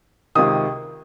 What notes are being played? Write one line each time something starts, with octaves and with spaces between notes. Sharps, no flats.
C#2 C3 D#3 D#6